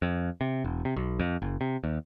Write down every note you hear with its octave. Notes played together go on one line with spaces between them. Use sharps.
F2
C3
E1
C3
B1
F2
F#1
C3
D#2